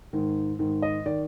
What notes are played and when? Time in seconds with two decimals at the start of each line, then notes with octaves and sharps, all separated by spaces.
0.13 G#2 D#3
0.59 G#2 D#3
0.82 D#5
1.06 D#3 D5